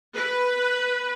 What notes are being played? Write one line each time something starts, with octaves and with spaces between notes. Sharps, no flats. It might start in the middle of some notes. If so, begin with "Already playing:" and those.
B4